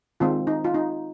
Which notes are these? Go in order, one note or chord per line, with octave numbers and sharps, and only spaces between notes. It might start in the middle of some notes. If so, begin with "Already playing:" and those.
D#3 G#3 C4 F4
D#4
F4
D#4